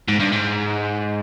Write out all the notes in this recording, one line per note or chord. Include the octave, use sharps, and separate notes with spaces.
G#2
G2
G#2